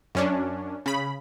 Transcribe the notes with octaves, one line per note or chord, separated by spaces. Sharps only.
F#2 C#4 D4
C#3 B5